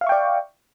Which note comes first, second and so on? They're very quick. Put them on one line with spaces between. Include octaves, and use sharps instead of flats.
F5 E5 C#6 G5 D5